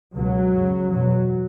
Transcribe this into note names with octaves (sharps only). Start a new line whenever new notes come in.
C#2 B2 F#3
F#2 C#3
E2 B2 F#3